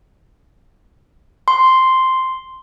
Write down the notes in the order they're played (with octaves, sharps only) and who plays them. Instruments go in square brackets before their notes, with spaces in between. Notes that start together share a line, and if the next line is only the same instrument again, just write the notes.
[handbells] C6